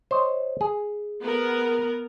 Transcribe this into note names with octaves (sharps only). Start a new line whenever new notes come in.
C5 C#5 D#5
G#4
B3 A#4